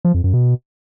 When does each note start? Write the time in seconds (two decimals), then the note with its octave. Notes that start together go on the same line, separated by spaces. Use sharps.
0.05 F3
0.14 F2
0.24 F#2
0.34 B2